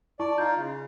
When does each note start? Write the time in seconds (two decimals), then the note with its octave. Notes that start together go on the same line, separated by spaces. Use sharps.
0.20 E4 D5 A5 C#6
0.38 D#4 F4 G6
0.57 C#3